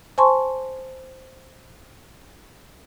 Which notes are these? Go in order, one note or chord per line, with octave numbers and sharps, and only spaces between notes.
C5 G#5 A5 C6 C#6